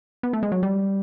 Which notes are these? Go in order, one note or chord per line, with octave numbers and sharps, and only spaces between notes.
B3
A3
G#3
F#3
G3